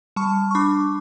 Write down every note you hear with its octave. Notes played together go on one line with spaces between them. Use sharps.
G3 A5 C#6
C#6
D4 B5 D6